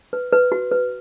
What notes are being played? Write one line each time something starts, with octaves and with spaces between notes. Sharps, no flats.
B4
B4
F#4
B4